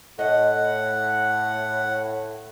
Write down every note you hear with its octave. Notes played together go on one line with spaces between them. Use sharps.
A2 D#5 F#5